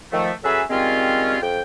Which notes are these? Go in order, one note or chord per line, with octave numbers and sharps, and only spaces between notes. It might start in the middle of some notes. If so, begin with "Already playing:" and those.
D#3 F3 A3
F#3 C#4 G#4 A4 B4 E5
D#3 G3 G#3 C4 C#4 F4
F2 G5